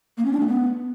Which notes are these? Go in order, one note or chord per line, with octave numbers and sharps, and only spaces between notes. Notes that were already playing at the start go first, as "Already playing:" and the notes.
A#3
C#4
D4
A3
B3